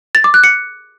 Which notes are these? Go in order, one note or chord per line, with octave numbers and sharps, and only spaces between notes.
A6
D6
F#6
C#7